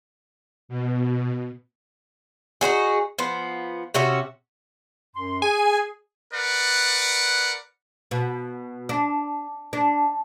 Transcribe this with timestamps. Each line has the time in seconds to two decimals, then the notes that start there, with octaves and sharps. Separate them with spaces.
0.69 B2
2.61 D#4 E4 F#4 G#4
3.19 F3 B3
3.94 C3 C#4 F#4 E5
5.15 F#2 C6
5.42 G#4 G#5
6.34 A#4 B4 D5 F#5
8.11 B2
8.89 D4
9.73 D4